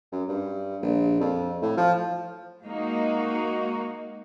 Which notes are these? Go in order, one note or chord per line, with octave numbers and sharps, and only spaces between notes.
F#2
G2
A#1
F2
A2
F3
G#3 A#3 D#4 F#4